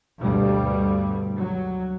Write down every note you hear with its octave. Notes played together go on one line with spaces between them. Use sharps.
D2 G2 B2 G3
F#3